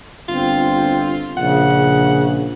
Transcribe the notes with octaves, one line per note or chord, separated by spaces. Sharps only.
G1 C4 F4
A#1 C#3 F#5